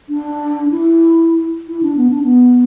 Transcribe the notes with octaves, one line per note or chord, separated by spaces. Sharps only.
D4
E4
E4
D4
B3
D4
B3